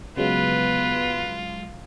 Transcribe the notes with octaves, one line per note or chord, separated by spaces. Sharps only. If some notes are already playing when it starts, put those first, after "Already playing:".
C#3 F#3 G#3 B3 F4 B4